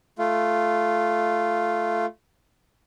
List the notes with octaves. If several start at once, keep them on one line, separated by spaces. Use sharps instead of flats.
A3 F4